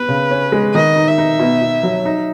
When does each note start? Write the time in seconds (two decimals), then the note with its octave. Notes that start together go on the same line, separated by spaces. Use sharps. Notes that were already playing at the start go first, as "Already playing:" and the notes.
Already playing: B3 B4
0.08 C#3
0.31 C#4
0.52 G#3
0.74 D#3 D#5
0.96 D#4
1.08 E5
1.18 D#4
1.39 B2
1.61 B2
1.83 F#3
2.05 D#4